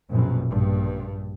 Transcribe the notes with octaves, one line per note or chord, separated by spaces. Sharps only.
A#1 F#2 B2
A#1 G2